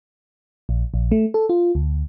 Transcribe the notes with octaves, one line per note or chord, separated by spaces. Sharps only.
A#1
A#1
A3
A4
F4
D2